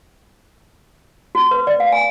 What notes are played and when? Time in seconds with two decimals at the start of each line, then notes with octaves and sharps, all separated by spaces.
1.35 F#4
1.51 B4
1.67 D5
1.80 F5
1.92 G#5